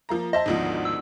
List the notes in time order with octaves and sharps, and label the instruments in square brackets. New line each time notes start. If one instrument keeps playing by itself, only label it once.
[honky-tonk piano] F3 A#3 A#5
[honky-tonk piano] C5 E5 A5 [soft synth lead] D#5
[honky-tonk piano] G#1 D2 F3 [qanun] B3 D4 D#4
[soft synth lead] E6